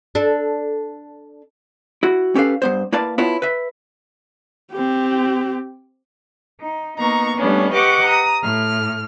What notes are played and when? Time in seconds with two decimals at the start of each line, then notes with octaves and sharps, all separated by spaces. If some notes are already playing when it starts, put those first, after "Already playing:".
0.15 D4 A4
2.03 E4 F#4
2.35 C#4 G4 A4 B4 F5
2.62 G2 B3 C5
2.92 A#3 E4 B4 D5 F5 A5
3.18 B3 E4 F4 B4 C#5 A5
3.42 B4 E5
4.72 C4 G4
6.59 D#4
6.98 A#3 B3 D#4 A#5 C#6
7.37 G3 A3 B3 C#4 D4
7.73 G4 B4 D#5 F#5 C#6 D6
8.04 A#5 D#6
8.42 A2 F6